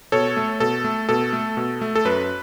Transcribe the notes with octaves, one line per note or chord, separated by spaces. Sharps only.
B2 A4 C#5
A3
B2 A4
A3
B2 A4
A3
B2
A3
A4
F#2 B4